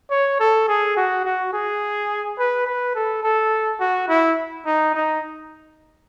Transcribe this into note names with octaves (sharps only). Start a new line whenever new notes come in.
C#5
A4
G#4
F#4
F#4
G#4
B4
B4
A4
A4
F#4
E4
D#4
D#4